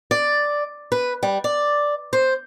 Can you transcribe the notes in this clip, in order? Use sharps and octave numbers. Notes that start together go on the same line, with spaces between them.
D5
B4
G3
D5
C5